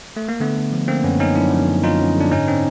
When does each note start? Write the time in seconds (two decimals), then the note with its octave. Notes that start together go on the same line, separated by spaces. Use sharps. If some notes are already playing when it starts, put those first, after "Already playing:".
0.17 A3
0.29 A#3
0.40 D3 A3 B3
0.56 D3
0.72 F3
0.88 D3 A#3 C4
1.04 F#2 B3 C#4
1.20 F#2 C#4 D#4
1.36 F#2 D4 E4
1.51 F3
1.68 F#2
1.83 F3 D#4 F4
2.00 F#2
2.16 D3 D4
2.31 G#2 C#4 D#4
2.47 C4 D4